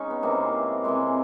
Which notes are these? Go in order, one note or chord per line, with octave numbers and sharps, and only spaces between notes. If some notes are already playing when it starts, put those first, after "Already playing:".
Already playing: G#3 C#4 D#4
B3
C3 E3 G#3 A#3 C4
C3 E3 G#3 A#3 C4